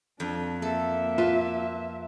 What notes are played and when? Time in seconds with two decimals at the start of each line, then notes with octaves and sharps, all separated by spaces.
0.20 F2 D4
0.62 A#3 A4 E5
1.18 F4 B4